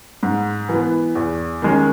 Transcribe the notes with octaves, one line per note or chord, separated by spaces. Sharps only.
G#2
E3
B3
E2
D#3 G#3 C#4